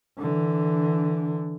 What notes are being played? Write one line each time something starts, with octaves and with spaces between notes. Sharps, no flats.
D3 E3